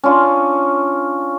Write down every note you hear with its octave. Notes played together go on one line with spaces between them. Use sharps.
C#4 D4 F4